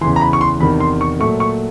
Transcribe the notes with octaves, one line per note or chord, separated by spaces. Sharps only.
E2 C#3 E3 C6
A#5
B5
C#6
C6
E2 C3 D#3 B5
C6
C#6
A#2 F#3 A3 C#6
C#6